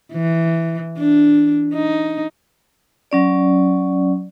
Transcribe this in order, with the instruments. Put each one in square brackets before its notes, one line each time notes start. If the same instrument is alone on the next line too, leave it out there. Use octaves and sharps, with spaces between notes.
[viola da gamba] E3
D4
D#4
[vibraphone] F#3 C#4 D5